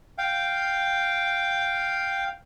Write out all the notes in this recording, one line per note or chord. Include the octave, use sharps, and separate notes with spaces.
F5 G5